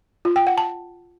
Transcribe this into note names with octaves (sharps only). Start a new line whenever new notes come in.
F4
G5
F#5
A5